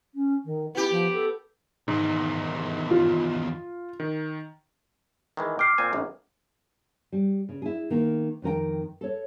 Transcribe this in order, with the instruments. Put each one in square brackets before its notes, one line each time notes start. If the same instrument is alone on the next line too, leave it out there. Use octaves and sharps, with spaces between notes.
[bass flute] C#4
D#3
[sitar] B3 G4 [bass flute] E4
[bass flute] F3
A4
[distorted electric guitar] E2 D#3 [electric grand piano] G#2 D#4
[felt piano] F4
[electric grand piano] D#3
[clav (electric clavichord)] D#3 E3 G#3
[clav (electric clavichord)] G5 [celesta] D6 F6 C7
[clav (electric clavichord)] A#2 C4 G#5
G#1 F#2
[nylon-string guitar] G3
C#3
E4 G#4
D#3 A#3
F2 D#3 A#4 G5
A4 C#5